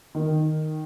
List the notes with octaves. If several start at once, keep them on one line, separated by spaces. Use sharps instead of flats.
D#3